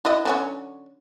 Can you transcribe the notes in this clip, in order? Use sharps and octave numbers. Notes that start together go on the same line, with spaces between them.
E4 F#4 D#5
D3 F#3 C#4